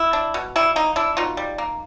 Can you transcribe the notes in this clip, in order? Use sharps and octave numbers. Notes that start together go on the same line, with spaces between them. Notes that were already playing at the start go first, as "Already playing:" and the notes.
Already playing: E4
D4
B2
G3 E4
A#3 D#4
D4 E4
B2 D#4 F4
G3
A#3